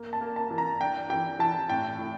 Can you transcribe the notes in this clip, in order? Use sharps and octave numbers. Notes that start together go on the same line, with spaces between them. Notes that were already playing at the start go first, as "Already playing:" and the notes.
Already playing: A#3
A5
A#3
A5
E3
A#5
D4 G5
E3 G5
E3 A5
A2 G5
A2